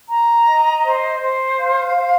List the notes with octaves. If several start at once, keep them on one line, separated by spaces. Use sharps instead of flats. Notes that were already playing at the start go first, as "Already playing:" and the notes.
A#5
D#5
C5
C5
F5
C5